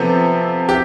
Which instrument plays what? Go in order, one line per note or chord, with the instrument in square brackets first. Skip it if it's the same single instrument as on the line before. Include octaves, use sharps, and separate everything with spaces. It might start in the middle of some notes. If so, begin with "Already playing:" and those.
Already playing: [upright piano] C3 F3 B3 A4
G4